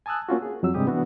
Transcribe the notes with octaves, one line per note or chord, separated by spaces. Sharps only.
G#5 A5 D#6 E6 F#6
A#3 C#4 F4 F#4
G#4
F2 F#3 E6
G2 C3 G3 G#3 G4 D#6
E3 B3 D4 F#4